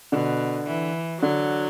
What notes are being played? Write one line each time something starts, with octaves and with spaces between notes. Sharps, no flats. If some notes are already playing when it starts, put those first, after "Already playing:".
B2 D3
E3
D3 F#3